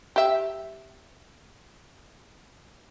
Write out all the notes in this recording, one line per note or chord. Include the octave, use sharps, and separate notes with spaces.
G4 E5